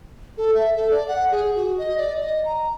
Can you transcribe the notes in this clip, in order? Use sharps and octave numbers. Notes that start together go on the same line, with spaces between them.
A4
E5
A4
D5
F#5
G#4
F#4
D#5
D5
D#5
A#5